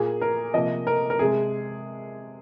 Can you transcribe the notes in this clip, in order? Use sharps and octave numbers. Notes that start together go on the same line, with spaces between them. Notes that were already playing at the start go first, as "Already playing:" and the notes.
Already playing: A#2 A#3 G#4
A#4
C3 F3 A#3 D#5
A#4
A#4
C3 G#3 G#4